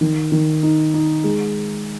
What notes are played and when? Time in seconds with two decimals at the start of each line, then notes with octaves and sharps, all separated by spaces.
0.01 D#3
0.32 D#3
0.63 D#4
0.94 D#4
1.24 G#3